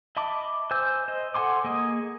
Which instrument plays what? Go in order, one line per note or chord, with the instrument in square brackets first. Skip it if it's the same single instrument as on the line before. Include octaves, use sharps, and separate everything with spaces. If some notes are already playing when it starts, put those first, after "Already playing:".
[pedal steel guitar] D#5 E5 A5 B5 D6
C5 G#5 E6 G6
C5 D#5
A4 F#5 G#5 C6 D6
A#3 G#4 D#5